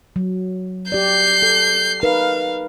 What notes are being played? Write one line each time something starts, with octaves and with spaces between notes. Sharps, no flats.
F#3
G4 D5 G6 C7
A4
D#4 A#4 B4 F5